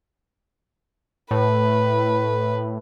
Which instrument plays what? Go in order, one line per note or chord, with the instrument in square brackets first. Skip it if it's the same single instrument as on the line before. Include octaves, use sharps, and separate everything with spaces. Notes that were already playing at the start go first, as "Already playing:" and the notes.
[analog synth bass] A2 [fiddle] B4